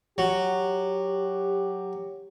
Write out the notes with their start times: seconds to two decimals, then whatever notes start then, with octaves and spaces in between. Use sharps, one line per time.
0.18 F#3 G4